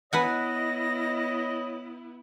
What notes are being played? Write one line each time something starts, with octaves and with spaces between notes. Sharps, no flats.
B3 E4 B4 C#5 D#5 F#5 G#5 A#6